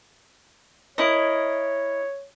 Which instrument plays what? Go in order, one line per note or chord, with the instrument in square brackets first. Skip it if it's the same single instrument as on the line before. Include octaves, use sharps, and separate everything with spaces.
[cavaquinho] E4 A#4 D#5 [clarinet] C#5